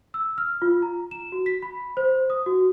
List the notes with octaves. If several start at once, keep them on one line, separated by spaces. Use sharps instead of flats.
E6
F6
F4
A#5
E7
F#4
B6
B5
C5
D#6
F#4